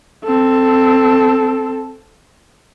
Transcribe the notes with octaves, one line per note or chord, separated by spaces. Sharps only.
C4 A4